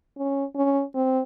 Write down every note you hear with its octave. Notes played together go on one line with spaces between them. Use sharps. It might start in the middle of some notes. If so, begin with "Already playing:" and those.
C#4
C#4
C4